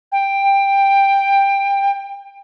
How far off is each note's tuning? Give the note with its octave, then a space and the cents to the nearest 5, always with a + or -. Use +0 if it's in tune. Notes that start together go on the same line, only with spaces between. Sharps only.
G5 +15